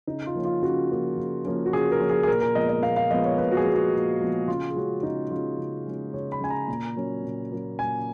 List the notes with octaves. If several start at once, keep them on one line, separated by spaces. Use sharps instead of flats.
C#3 D#4
F4
F3 A#3 C#4
F4
C#3 F#4
F3 A#3 C#4
C#3
F3 A#3 C#4
F#4
C#3 G#4
A#4
F3 A#3 C#4
G#4
G#4
A#2 A#4
A#4
F3 G#3 B3 D#5
D#5
A#2 F5
F5
F3 G#3 B3 D#5
C#5
A#2 B4
F#4
G#4
F3 G#3 B3
F#4
A#2
F3 G#3 B3
C#3 F4
G#4
G#3 C#4 F#4
C#3 D#4
G#3 C#4 F4
C#3
G#3 C#4
C#3 C#5
B5
G#3 C#4 G#5
A#5
A#2
F#3 A#3 C#4
A#2
F#3 A#3 C#4
A#2 G#5